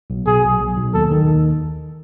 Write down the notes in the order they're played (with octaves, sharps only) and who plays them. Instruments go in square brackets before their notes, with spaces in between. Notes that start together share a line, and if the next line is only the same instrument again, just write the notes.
[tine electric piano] B1
[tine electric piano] B2 [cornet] G#4
[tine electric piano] B1
B1
B1
[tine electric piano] D#2 [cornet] A4
[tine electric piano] D#3